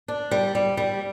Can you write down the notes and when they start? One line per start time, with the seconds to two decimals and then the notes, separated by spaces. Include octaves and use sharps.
0.08 D4
0.31 G3
0.55 G3
0.77 G3